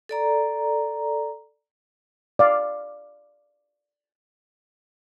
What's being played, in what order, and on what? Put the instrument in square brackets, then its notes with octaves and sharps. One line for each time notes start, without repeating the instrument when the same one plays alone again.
[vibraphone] A4 D5 A#5
[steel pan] D5 F5